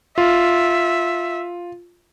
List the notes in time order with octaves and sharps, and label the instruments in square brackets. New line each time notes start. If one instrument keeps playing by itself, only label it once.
[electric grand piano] F4 [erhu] E5